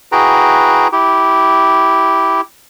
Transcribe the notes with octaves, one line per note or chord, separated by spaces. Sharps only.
E4 F#4 G#4 B4 G5 A#5
E4 G4